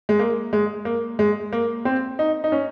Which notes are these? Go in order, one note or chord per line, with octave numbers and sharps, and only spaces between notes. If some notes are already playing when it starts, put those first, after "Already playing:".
G#3
A#3
G#3
A#3
G#3
A#3
C4
D#4
D#4
C#4